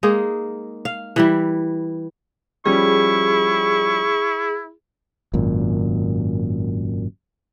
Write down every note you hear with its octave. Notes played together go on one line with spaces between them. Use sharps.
G#3 A#3 D#4 G#4
F5
E3 G3 E4
F3 G3 C#4 E4 G#4 C#6
G#1 F#2 A#2